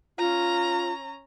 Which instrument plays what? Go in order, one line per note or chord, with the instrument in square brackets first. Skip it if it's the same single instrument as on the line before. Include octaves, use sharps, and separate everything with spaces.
[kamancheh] C#4 A#5 [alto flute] F4